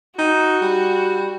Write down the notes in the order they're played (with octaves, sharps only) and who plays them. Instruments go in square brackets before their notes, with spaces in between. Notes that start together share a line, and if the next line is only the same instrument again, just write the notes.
[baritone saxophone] D#4 [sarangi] F#4
[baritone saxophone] G3